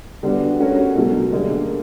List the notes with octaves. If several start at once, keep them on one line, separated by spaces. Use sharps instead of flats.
D3 G3 B3 D4 F#4
A3 C#4 F#4 A#4 C#5
B2 F#3 A3
D3 G3 A#3 D#4 G#4